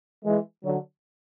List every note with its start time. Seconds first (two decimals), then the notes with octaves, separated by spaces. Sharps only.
0.24 E3 G#3
0.63 D3 F#3